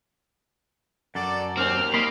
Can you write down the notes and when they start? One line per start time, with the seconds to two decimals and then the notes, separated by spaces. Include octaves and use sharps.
1.15 F#2 F#4 A4 D5
1.57 D#2 C4 F6
1.94 A#3 D#5 B5 C6